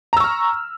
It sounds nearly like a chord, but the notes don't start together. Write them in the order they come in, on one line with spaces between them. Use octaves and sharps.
A#5 E6 C#6 F6